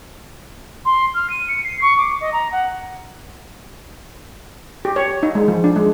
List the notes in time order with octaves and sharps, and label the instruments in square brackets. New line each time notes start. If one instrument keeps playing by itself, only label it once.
[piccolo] C6
F6
D#7
C#7
C7
C#6
D6
D#5
A#5
F#5
[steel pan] G4
C#5
D#4
G#3
F3
D4
G#3